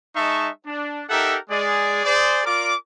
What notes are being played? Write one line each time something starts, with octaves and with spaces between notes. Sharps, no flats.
G#3 D#4 E5 A5 C#6
D4
D#4 G4 A4 A#4 E5 F#5
G#3 G#4 D5
G#4 C5 D5
F4 A#4 D5 D6